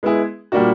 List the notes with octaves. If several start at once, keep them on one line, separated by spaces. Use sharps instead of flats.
G#3 B3 E4 G#4
A#2 G3 A#3 D4 F#4